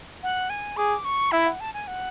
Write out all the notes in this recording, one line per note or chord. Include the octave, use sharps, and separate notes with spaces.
F#5
G#5
G#4 D6
C#6
E4 E5
F#5
A5
G#5
F#5